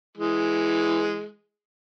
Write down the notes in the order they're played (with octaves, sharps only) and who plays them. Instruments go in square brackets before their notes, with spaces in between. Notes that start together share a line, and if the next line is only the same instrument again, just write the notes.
[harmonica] E3 G#3